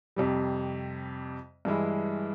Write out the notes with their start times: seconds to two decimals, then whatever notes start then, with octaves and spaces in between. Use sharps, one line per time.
0.16 F2 C3 G3
1.65 G2 E3 G#3 E4